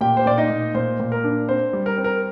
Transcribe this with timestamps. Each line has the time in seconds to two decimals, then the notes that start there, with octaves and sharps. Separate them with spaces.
0.01 A#2 G4 G5
0.17 C5
0.26 A#2 D5
0.38 D#4 D#5
0.50 A#2
0.75 A#2 C5
1.00 A#2
1.12 A#4
1.24 D4
1.49 C4 C5
1.73 G3
1.86 A#4
1.98 C4
2.04 A#4